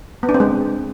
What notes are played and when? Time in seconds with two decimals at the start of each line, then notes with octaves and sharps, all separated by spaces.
0.23 B3
0.29 D4
0.34 C4
0.40 G#3